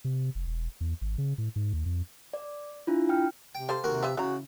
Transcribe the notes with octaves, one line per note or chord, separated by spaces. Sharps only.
C3
F1
E1
E2
G#1
C#3
A2
G#2
D#2
F2
D5
D4 E4 F4
G5 F6
C3 G5
G4 A4 C5 F5
D#2 C3 F#4 A#4
F3 G4 B4 E5
C#3 E3 F#4 A#5